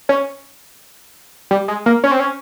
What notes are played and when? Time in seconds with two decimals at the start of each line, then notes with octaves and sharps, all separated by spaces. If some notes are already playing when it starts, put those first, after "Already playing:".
0.09 C#4
1.51 G3
1.68 G#3
1.86 A#3
2.04 C#4
2.11 C4
2.20 C#4